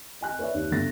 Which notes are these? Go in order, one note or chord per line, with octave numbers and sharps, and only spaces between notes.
D#5 G#5 F#6
B4 C#5 D5 E5
D#2
G1 C#3 A3 A6 A#6